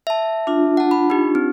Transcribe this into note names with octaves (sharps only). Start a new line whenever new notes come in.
E5 A5
D4 F4
F#5 A5
B5
D#4 G4
C4